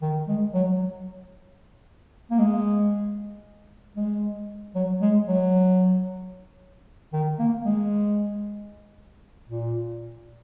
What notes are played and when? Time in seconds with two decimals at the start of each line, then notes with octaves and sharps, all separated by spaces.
0.02 D#3
0.28 G#3
0.54 F#3
2.31 A#3
2.39 G#3
3.97 G#3
4.75 F#3
5.01 G#3
5.28 F#3
7.13 D#3
7.39 A#3
7.65 G#3
9.49 A#2